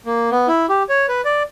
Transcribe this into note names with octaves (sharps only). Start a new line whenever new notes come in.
A#3
B3
E4
G4
C#5
B4
D5